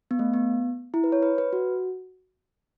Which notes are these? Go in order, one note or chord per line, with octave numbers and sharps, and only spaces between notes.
B3
A3
B3
E4
B4
C#5
B4
B4
F#4